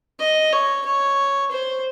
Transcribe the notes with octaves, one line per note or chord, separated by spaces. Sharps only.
D#5
C#5
C#5
C5